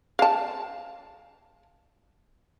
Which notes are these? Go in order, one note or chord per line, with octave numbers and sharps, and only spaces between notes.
F5 A5